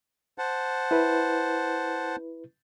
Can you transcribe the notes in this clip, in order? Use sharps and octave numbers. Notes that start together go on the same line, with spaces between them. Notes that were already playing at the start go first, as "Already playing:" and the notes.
C5 F#5 A5
E4 B4